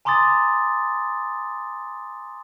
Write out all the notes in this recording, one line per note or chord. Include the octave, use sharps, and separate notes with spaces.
G#5 A#5 C6 D6 D#6 A6